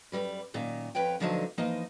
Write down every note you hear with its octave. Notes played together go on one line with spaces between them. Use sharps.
F#2 A#2 G3 B4
F#2 A#2 D#3 A#5
F2 B4 C#5 G5
D2 D3 F3 F#3 D#4 A5
E3 F3 A#3 D#4 D#5